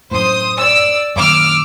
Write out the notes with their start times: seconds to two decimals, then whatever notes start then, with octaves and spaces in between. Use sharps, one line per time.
0.11 F#2 A2 C5 D#6
0.57 D5 E6
1.16 F#2 A#2 D#3 D6 E6 F6